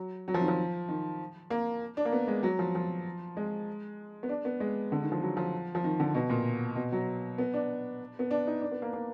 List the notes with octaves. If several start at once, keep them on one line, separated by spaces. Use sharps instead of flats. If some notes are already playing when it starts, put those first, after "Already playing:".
Already playing: F#3
F#3
F3
D#3
F3
D#3
A#3
D4
A#3
B3
G#3
F#3
F3
F3
G#3
B3
D4
B3
G#3
D3
D#3
F3
F#3
F3
F3
D#3
D3
B2
A#2
B2
F#3
B3
D4
B3
D4
D#4
D4
B3
A#3
A#3